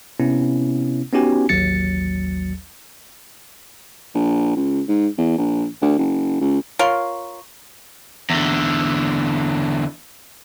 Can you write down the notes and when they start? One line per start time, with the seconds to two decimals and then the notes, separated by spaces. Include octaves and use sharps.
0.20 C3 B3 C#4 E4
1.13 B3 C#4 D#4 F#4 G4 G#5
1.49 A1 D#2 F#3 A6 C#7
4.15 A#1
4.57 C#2
4.88 G#2
5.18 E2
5.38 A#1
5.82 D2
5.98 F#1
6.41 C#2
6.79 F4 A#4 C#5 C6
8.30 E2 D3